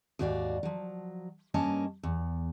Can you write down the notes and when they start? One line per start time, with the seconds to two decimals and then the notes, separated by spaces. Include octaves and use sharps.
0.19 D#2 G#2 F#4 C#5 D5 F5
0.63 F3 F#3
1.54 G2 A#3 C#4 D#5 A5
2.03 E2